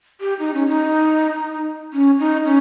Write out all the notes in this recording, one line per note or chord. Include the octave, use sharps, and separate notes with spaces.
G4
D#4
C#4
D#4
C#4
D#4
C#4